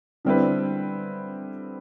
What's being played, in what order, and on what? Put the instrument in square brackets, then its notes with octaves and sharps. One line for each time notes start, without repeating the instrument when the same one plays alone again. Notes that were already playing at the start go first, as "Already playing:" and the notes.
[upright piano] D3 G3 C4 E4 B4